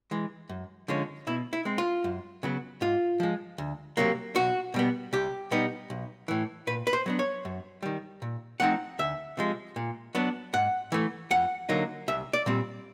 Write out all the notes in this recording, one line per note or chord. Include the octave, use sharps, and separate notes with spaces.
E3 G#3
F#2
D3 F3 G#3 C#4
B2 E4
E4
G#3 C4
F4
F#2
C#3 F#3 B3
G#2 F4
F3 G#3
D2
C3 D#3 F#3 A#3
B1 F#4
B2 G3 B3
C2 G4
B2 G3 B3 D#4
B1
A2 E3
A#2 B4
B4
C5
F#3 B3 D4
C#5
F#2
D#3 G3
A#2
F3 A3 C4 D#4 F#5
D2 E5
C3 F3 G#3
A#2
F#3 B3 D4
G#2 F#5
E3 A3
F2 F#5
D3 F#3 A#3 D#4
C2 E5
D5
A#2 G3 C4